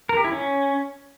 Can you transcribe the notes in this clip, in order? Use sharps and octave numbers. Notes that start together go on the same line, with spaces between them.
A#4
G4
E4
C#4